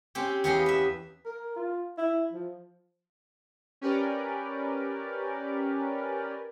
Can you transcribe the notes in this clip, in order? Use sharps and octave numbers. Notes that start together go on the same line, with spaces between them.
C4 C#4 G4
E2 B3 C#4 G4 D#5 F5
B4 E5
A#4
F4
E4
F3
C#4 G4 A#4 B4 D5